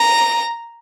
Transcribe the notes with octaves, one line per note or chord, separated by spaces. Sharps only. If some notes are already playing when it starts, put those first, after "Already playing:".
Already playing: A#5